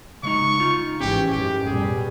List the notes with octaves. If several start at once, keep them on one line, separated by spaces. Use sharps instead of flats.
C#3 G#3 D#4 C#6
D#4 F4
G#1 E3 C#4 G4 G5
A1 F#2 G4
B2 G3 G#4